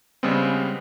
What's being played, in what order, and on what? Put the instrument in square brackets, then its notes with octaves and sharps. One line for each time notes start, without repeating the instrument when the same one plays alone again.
[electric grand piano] C#3 G3 G#3 B3 C4